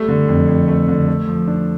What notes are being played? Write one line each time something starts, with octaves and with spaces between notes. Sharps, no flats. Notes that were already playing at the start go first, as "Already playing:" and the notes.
Already playing: G3 A3
D3
F2
F2
A3
D3
A3
F3
D4